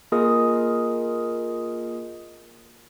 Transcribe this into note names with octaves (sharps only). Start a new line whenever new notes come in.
A#3 F4 G#4 A#4 D#5 D#6